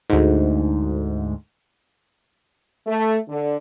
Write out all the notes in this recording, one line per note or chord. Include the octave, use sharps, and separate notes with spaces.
D2 G#2
A3
D3